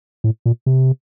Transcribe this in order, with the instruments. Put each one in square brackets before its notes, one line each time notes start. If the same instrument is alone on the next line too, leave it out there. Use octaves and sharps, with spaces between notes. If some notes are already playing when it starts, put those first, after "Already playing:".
[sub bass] A2
A#2
C3